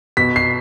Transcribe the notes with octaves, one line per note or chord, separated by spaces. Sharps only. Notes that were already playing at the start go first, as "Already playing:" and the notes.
B2 B6
C7